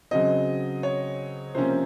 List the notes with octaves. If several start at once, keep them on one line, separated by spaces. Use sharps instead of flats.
C#3 F#3 C4 D#5
C#5
C3 F3 A#3 C#4 C5